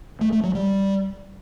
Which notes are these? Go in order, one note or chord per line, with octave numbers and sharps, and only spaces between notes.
A3
A3
F#3
G3